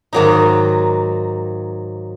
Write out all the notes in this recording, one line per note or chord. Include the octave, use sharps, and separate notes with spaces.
G#2 D#3 F#3 A#3 D#4